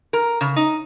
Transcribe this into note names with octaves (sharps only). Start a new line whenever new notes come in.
A#4
C#3
D#4